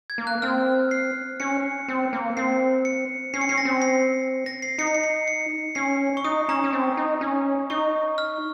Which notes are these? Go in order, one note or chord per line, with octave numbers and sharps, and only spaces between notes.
G#6
A#3
F#6
C4 F6
C7
C#4 C#7
C4
A#3
C4 C7
C#7
C#4 C7
C#7
C#4 C7
A#6
C4
C7
A#6
C7
D#4 C#7
C7
C#7
C7
C#7
C#4 C7
C#6
D#4 D#6
C#4 A#5
C#4
C4
D#4
C#4
D#4 C#6
F6